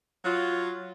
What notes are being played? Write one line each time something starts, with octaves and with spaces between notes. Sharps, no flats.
F#3 F4